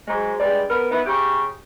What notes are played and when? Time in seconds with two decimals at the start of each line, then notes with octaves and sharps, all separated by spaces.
0.08 G#2 F#3 G#3
0.40 G2 G3 G#3 D5
0.69 B3 A#4
0.91 B3 D#4 E4 B4
1.06 C#3 G4